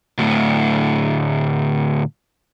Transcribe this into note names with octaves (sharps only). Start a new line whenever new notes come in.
D2 A2